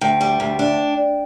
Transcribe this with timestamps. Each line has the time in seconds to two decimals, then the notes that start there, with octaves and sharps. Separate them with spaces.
0.01 D2 G5
0.21 G3
0.40 D2
0.59 D4